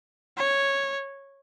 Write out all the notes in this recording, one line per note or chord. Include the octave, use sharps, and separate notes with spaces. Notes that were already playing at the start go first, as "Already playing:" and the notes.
C#5